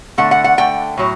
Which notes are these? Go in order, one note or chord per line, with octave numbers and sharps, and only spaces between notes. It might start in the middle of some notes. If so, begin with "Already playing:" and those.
D3 A3 F#5
F#5
F#5
D3 A3 G5
A2 F#3